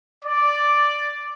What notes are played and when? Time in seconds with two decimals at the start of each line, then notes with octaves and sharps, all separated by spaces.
0.25 D5